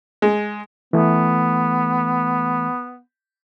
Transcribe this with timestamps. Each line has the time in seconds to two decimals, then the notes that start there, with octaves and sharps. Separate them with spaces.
0.22 G#3
0.93 E3 A3 B3